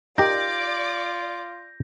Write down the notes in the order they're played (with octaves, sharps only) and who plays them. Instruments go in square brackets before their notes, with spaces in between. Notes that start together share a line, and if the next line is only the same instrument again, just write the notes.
[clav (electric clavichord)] D#4 G4 A#4 [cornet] F4 [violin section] D5 D6 [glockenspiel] G6 A#6